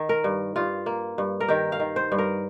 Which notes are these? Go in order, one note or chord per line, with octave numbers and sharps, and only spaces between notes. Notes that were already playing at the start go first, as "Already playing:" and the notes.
Already playing: D#3
A#4
G2
G2 F4
A#3
G2
A#4
D#3 G4
F5
D#3
C5
G2
A#4